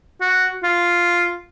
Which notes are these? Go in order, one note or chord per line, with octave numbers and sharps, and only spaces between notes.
F#4
F4